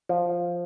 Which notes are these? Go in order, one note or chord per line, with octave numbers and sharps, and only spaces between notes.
F3